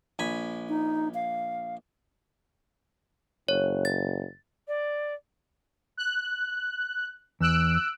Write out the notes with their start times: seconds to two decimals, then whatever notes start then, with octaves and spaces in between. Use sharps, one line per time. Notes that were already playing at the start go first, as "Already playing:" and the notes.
0.19 A#1 G#5 B5
0.69 D#4
1.14 F5
3.48 F#1 C#5
3.85 A6
4.67 D5
5.97 F#6
7.41 E2 E6 F#6 D7